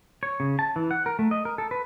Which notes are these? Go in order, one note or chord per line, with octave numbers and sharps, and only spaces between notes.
C#5
C#3
A5
E3
F#5
A#4
A3
D#5
A#4
A4
B4